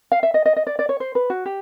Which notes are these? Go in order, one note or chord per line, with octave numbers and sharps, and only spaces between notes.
F5
E5
D#5
D#5
D#5
D5
D5
C#5
C5
B4
F#4
G4